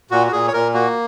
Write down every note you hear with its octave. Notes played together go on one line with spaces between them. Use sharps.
A#2 F#4
F#4
A#2 G#4
C#5
A#2 A#4
A#3 F#4